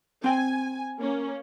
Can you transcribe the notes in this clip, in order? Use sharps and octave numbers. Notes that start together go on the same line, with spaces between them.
C4 G5 G#5
A#3 C#4